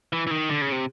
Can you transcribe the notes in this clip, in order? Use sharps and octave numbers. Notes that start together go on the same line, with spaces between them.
E3
E3
D#3
D3
C#3
C3